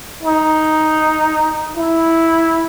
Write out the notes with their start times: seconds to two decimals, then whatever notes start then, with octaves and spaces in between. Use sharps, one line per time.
0.23 D#4
1.77 E4